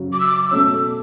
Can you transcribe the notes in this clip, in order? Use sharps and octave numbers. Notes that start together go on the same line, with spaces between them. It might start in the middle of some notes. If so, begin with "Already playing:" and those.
Already playing: F#2 C#3 F#3
D6
E6
D6
B2 A3 C#4 E6